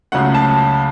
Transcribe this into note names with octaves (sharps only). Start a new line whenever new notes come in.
C#2 C#3 F#3 A3 F#5
A5